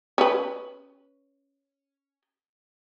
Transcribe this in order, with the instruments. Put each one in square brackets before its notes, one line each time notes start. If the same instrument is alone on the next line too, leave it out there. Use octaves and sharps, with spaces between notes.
[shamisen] C#4 B4